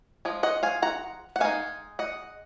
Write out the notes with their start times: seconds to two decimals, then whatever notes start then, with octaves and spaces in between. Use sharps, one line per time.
0.25 F3 G#3
0.43 D#5 F#5
0.63 F5 G#5
0.82 F#5 A#5
1.36 F#5
1.40 G#3 D#4 F5 G#5
1.99 D#5 F#5